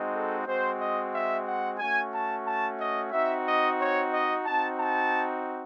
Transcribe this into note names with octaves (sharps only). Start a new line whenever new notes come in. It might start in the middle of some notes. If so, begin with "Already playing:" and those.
Already playing: G#3 C4 D#4 F#4
A4
G#3 C4 F#4 C5
D#5
E5
F#5
A3 C#4 F#4 G#5
A5
A5
D#5
C4 D#4 F#4 E5
D#5
C#5
D#5
C4 D#4 F#4 A5
A5